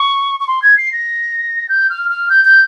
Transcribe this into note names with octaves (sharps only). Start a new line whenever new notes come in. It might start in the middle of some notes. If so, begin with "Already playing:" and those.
Already playing: C#6
C#6
C6
G#6
C7
A#6
G6
F6
F6
G6
G6